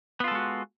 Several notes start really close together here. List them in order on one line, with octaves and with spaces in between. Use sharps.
B3 F4 A4 G#3 F#4